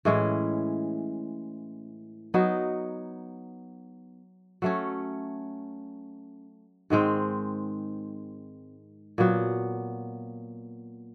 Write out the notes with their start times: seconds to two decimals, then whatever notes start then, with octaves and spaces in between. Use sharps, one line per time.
0.05 A2 E3 G#3 C#4
2.34 F#3 B3 D#4
4.62 F#3 A3 C#4
6.90 G#2 D#3 G#3 C4
9.18 A#2 F#3 B3